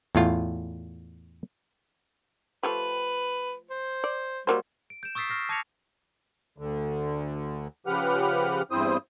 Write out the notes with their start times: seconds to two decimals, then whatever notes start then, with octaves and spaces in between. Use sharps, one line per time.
0.15 E2 A2 F4
2.63 F3 A3 G4 B4
3.70 C5
4.04 D5
4.47 F#3 G3 A#3 C5
4.90 D7
5.03 G6 D7 E7
5.15 C#6 D#6 E6 A6 B6 C7
5.29 C#6 F6 A#6 C7
5.49 A5 D6 G#6 A#6 C#7 F7
6.58 D2 D3
7.87 C#3 F3 G4 B4 F#5 F6
8.71 E2 G2 C4 E4 C5 D#6